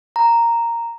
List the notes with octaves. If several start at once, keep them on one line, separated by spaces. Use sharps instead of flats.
A#5